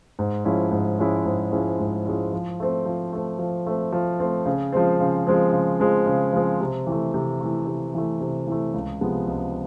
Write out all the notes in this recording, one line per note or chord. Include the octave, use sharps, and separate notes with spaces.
G#2
F3 G#3 C#4 E4
G#2
F3 G#3 C#4 E4
G#2
F3 G#3 C#4 E4
G#2
F3 G#3 C#4 E4
F3
A3 C4
F3
A3 C4
F3
A3 C4
F3
A3 C4
C#3
F3 G#3 C4
C#3
F3 G#3 C4
C#3
F3 G#3 C4
C#3
F3 G#3 C4
C3
E3 A3
C3
E3 A3
C3
E3 A3
C3
E3 A3
C#2
C3 F3 G#3 B3
C#2